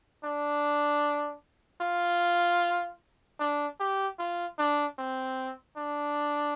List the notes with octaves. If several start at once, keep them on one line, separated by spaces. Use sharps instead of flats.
D4
F4
D4
G4
F4
D4
C4
D4